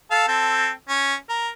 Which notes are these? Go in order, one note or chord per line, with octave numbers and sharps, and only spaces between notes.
A4 F5
C4 A4
C#4
A#4